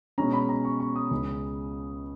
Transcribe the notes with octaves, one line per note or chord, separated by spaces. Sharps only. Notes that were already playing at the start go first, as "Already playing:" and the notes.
B2 G#3 C#4 A#5
B5
A#5
C#6
C#6
D#6
C#2 C#3 G#3